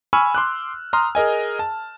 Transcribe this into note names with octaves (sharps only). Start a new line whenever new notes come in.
G#5 B5 C#6 E6 F6
C6 D6 F#6
A#5 C6 D#6 F6
G#4 A#4 D#5 G#5
A5